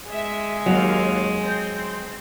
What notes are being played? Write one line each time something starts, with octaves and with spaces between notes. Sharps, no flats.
G#3 E5
D#2 F#3 F5
C4